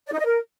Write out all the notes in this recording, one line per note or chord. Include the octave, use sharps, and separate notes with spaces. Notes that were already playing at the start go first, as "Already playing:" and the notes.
D5
D#4
D#5
A#4